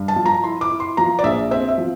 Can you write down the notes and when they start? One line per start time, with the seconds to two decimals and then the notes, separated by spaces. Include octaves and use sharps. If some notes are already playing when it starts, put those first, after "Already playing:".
Already playing: G2
0.08 A5
0.16 F3
0.26 A#5
0.44 E4 C6
0.61 D6
0.71 E4
0.80 C6
0.97 F3 A#5
1.19 D5
1.24 A#1 E5
1.51 C4 E5
1.68 E5
1.78 F3